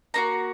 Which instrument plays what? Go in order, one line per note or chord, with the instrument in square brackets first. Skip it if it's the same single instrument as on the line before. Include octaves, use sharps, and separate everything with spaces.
[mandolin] A#3 D#4 F#4 A#5